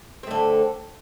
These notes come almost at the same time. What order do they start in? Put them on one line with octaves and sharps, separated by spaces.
C4 A3 D3